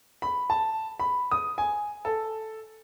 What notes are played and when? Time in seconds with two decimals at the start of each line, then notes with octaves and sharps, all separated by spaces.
0.22 B5
0.50 A5
1.00 B5
1.31 D#6
1.58 G#5
2.05 A4